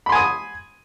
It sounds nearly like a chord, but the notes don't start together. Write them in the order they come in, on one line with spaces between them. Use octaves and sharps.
B5 C6 G#5 D#6